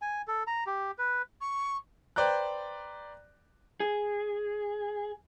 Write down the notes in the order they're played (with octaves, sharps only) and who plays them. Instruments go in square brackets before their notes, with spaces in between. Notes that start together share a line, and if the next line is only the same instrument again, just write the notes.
[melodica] G#5
A4
A#5
G4
B4
[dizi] C#6
[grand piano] B4 C5 D5 G5 A#5 F#6
[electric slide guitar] G#4